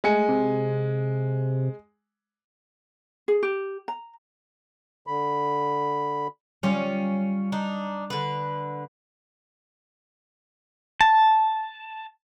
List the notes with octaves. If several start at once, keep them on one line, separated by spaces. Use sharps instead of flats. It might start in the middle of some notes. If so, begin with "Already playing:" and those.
G#3 A3 G#5 C#7
C3
G#4
G4
A#5
D3 B5
G3 C#4 F4
D4 D#4
D3 B4
A5